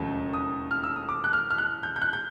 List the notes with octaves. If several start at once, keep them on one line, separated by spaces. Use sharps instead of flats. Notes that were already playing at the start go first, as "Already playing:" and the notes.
Already playing: E1 D#2 C#3 F3 A3
D#6
F6
E6
D#6
D6
F#6
F6
F6
F#6
G6
G6
F#6
G6